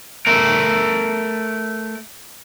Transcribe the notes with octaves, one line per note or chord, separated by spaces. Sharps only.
A3 A#4